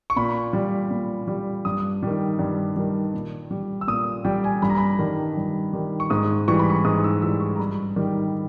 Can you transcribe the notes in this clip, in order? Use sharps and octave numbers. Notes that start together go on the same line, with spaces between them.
C#6
A#2 B5
G3
A#2
G3
G2 D#6
D#3 G3
G2
D#3 G3
A#2
G3
E6
A#2 D#6
G3 G5
G#5
G2 B5
A#5
B5
D#3 G3
G2
D#3 G3
C#6
G#2 D#6
E3 G3 C#6
B5
C#6
G#2 D#6
E6
E3 G3 E6
C#6
A#5
G2 B5
D#3 G3